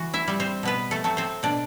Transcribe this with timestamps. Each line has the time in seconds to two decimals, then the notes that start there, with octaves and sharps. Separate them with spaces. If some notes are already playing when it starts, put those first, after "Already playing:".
Already playing: E3 F#4
0.14 E4 E5
0.28 G3 C4
0.40 C4 C5
0.63 B2 B3 B4
0.91 A3 A4
1.04 F#3 A3 C4
1.17 C4 C5
1.43 B2 D4 D5